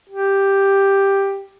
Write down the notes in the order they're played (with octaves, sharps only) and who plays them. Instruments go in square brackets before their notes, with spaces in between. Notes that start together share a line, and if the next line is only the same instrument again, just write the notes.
[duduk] G4